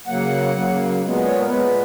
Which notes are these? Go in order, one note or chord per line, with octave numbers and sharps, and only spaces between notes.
C#3 F#3 A#3 F#5
C#3 F#3 A#3
A#2 G#3 B3
C#5
A#4
A#2 G#3 B3 B4